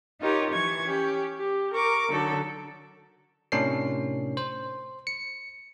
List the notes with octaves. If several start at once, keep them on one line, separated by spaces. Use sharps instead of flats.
D#4 F4 G4 A#4 C#5
E3 C#6 G#6
C#4 G4
G4
A#4 C#6 D6
D3 F#3 D#4 A4
A2 C3 C#4 D4 A#4 C7
C5
C#7